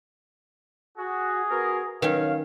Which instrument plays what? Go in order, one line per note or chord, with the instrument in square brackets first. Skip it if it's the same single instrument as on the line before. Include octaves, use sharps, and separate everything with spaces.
[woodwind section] F#4 [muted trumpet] G#4
[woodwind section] B3 F#4 A#4
[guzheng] D#3 C#4 [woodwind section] F#3 F5 [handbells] B4